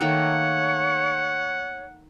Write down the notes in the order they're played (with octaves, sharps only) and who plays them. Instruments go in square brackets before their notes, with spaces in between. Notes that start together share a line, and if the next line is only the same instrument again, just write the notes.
[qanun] D#3 A3 A#3 [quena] C#5 [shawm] F#5